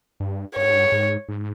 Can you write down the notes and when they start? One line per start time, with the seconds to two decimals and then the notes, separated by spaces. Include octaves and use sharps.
0.20 G2
0.56 G2 C#5
0.65 G#2
0.73 G2
0.92 G#2
1.28 G#2